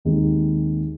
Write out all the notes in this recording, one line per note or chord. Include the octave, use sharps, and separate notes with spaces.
D#2 D#3 G#3 C4 D#4